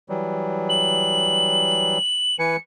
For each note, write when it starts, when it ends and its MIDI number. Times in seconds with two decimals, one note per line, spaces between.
0.09 1.98 52
0.09 1.98 54
0.09 1.98 55
0.69 2.39 102
2.39 2.56 52
2.39 2.56 71
2.39 2.56 80
2.39 2.57 97